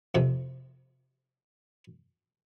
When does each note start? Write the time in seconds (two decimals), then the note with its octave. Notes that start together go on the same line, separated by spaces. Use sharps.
0.15 F2 C3